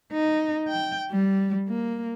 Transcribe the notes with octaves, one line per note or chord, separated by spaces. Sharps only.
D#4
G5
G3
A#3